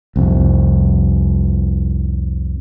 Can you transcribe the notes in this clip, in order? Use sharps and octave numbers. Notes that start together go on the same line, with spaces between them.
C2 F2